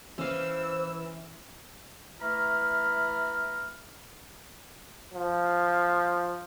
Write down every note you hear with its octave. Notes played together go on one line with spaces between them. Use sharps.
E3 C#4 C5 F5 E6
E3 A3 A#5 B5 F6
F3